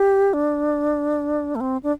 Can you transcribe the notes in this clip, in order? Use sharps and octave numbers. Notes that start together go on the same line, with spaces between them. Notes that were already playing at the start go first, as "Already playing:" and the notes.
Already playing: G4
D4
A3
C4
D4